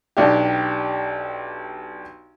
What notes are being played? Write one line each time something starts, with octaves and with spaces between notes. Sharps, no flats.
B1 D4 G4